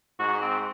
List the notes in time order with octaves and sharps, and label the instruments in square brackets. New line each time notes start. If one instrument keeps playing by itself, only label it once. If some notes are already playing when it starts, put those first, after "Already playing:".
[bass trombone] G#2 [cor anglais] F#4
[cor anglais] C4